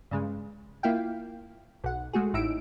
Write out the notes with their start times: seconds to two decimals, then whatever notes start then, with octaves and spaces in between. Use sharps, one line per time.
0.11 G2 C#3 G#3
0.83 A#3 E4 F4 F5 G5
1.84 B1 F#5
2.13 G#3 A3 F#4 G#4
2.34 A1 A2 D#4 E4 E6 D7